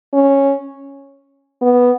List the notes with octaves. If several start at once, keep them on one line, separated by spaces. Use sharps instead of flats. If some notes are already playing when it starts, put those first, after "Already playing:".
C#4
B3